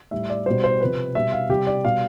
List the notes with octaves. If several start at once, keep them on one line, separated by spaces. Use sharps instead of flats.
A2 G3 E5
D5
B2 G3 C5
C5
C3 F3 B4
B2 G3 E5
F5
C3 G3 G4
D5
B2 G3 F5